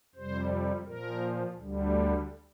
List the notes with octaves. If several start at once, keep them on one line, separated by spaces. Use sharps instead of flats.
F2 C3 G3 C5
A#2 F3 A#4
D2 D3 G3
G4